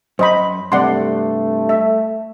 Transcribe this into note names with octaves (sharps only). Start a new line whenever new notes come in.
F#2 C5 D#5 B5
G2 C3 A3 D5 F#5 C6
E5